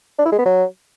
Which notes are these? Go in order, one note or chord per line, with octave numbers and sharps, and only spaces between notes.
D4
E4
G#3
B3
F#3